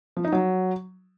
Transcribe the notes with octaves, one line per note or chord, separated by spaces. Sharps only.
F3
D#4
F#3